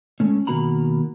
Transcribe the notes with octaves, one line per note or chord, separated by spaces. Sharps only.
G#3 A3 C#4
B2 D#3 A#3 F#4 A#5 B5